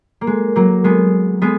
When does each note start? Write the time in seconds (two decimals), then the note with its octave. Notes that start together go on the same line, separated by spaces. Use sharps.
0.21 A#3
0.27 G#3
0.56 F#3 A#3
0.84 G#3 B3
1.42 G#3 B3